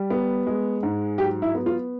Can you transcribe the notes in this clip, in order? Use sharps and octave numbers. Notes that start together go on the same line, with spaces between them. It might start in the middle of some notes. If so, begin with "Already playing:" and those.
Already playing: G3
B3
G#3
G#2
F#3 G4
E4
B3
F4